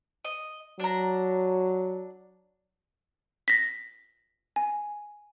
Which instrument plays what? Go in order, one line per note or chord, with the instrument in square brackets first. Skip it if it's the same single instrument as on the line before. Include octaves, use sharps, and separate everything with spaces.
[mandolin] D#5
[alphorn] F#3 [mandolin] D4 A#5
[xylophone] A#6 B6
G#5